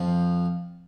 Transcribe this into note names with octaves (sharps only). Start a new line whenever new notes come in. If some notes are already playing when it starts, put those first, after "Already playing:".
Already playing: F2 F3